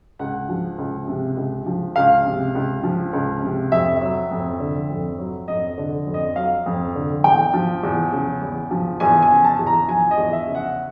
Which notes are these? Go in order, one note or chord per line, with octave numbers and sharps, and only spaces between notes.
C#2 F#5
F3
C#2
C3
C#2
F3
C#2 F5
C3
C#2
F3
C#2
C3
F2 E5
F#3
F2
D3
F2
F#3
F2 D#5
D3
F2
D#5
F#3 F5
F2
D3
E2 G5
F3
E2
C#3
E2
F3
E2 G#5
G#5
C#3
A5
E2
A#5
F3 G#5
D#5
E2
E5
C#3
F#5